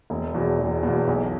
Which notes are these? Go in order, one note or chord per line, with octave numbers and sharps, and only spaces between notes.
E1
E2 B2
E1
E2 B2
B1